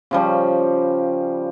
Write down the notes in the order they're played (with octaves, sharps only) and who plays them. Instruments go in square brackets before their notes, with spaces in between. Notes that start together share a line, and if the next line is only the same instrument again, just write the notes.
[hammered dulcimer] C#3 F3 G3